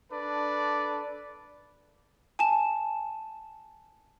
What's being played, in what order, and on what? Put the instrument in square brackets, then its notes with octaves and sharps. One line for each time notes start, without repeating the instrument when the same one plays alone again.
[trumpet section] D4 A4 B4 D5
[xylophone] G#5 A5 E7